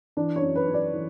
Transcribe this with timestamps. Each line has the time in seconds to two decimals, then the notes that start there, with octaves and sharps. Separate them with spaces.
0.17 E3 D4
0.36 C#5
0.42 F#2
0.55 B4
0.67 F#2
0.74 D5
0.94 E3